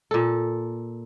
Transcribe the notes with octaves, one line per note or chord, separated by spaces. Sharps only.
A#2 A4